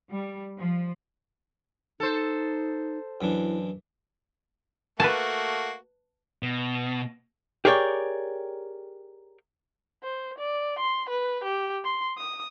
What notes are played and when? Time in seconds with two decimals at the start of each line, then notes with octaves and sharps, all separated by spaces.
0.10 G3
0.59 F3
2.00 D#4 A4 C5
3.21 F#2 E3 D4 E4
5.00 A3 A#3 F#4 B4 A5
6.43 B2
7.65 G4 G#4 A#4 C#5 D5 G5
10.03 C5
10.38 D5
10.79 C6
11.09 B4
11.44 G4
11.84 C6
12.17 D#6